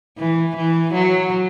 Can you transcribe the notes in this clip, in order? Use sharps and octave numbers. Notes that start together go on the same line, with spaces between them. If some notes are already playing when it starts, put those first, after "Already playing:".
E3
E3
F#3